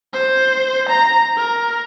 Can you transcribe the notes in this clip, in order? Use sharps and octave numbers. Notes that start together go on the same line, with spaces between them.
C5
A#5
A#4